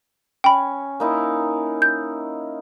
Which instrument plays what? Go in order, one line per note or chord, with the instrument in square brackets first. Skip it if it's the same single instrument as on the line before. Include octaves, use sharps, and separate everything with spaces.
[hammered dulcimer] C#4 [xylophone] G5 B5
[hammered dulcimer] A#3 D#4 E4
[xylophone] G6